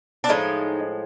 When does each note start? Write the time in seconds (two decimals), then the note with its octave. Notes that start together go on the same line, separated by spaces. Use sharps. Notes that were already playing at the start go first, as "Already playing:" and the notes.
0.24 D4
0.29 A2 F3 G#3 D#4